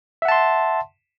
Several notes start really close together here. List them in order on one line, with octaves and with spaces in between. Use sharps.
E5 F#5 A5 C6